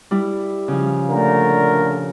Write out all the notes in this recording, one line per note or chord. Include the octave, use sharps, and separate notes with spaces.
G3 E4
C#3 F3
A#2 D3 A3 A#4